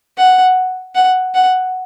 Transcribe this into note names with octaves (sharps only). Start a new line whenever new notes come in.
F#5
F#5
F#5